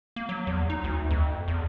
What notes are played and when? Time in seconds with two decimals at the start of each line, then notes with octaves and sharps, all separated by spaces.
0.16 A#3
0.29 F#3
0.47 E2
0.70 D#4
0.84 D2
1.11 F2
1.48 E2